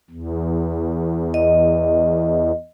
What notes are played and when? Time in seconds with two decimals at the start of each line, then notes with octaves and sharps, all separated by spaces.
0.10 E2
1.34 D#5